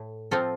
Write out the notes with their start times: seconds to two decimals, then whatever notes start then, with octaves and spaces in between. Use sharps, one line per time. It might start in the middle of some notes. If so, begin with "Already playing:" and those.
Already playing: A2
0.31 F3 C4 F4 A4